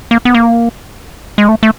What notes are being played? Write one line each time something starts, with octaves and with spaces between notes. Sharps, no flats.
A#3
B3
A#3
G#3
A3
A3